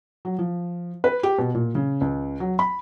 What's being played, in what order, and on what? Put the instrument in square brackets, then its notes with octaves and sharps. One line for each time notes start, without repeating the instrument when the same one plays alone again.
[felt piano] F#3
F3
B4
G4
B2
A#2
C#3
C#2
F#3
B5